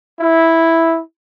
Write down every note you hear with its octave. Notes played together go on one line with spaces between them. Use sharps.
E4